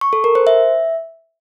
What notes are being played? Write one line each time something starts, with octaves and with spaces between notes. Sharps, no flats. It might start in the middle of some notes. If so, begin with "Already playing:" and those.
C#6
A4
A#4
C5
E5